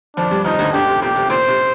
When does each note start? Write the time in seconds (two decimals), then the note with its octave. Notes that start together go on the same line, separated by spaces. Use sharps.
0.17 F2 F3 D4
0.31 G2 G3
0.45 F2 F3 D#4
0.59 D2 D3
0.73 D2 D3 G4
0.87 C3
1.02 A#2 G4
1.16 C3
1.30 A#2 C5
1.48 C3